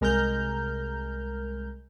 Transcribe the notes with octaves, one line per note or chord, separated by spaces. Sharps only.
C2 G#3 A#4 A#5 F6 G6